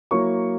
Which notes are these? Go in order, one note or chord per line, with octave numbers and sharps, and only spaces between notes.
F#3 A#3 E4 C#6